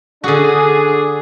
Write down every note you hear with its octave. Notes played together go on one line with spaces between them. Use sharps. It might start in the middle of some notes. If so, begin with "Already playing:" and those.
D3 D4 F#4 G#4